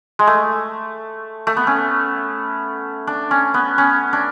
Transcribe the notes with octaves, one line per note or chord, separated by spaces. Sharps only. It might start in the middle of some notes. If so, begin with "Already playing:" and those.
G#3
A3
A3
B3
C#4
D4
C#4
B3
C#4
D4